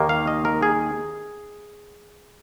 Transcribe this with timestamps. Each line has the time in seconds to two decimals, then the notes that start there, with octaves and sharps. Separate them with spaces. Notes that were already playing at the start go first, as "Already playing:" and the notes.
Already playing: D#2 D#3 A#3
0.09 F5
0.27 D#5
0.45 A#4
0.63 G#4